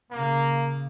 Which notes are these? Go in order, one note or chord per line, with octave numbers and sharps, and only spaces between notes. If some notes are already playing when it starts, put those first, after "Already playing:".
A#2 C#3 A#3